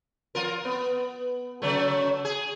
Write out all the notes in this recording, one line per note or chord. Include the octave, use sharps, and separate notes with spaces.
F3 F4 A#4
B3
C#3 F#3 A3
G#4